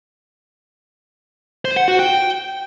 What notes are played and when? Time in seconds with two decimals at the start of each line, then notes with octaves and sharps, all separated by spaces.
1.65 C5
1.76 F#5
1.88 F#4
1.99 G5